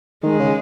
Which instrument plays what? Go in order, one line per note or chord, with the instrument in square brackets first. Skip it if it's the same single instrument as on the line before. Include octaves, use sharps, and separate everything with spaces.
[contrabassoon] D#3 [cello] G#3
[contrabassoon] C#3